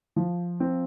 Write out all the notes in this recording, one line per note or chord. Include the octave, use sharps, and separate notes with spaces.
F3
C4